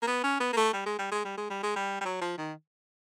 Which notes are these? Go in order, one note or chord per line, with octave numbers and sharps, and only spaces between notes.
A#3
B3
C#4
B3
A#3
A3
G3
G#3
G3
G#3
G3
G#3
G3
G#3
G3
G3
F#3
F3
D#3